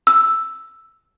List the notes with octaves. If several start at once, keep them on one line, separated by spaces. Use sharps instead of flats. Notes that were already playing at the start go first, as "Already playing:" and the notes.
E6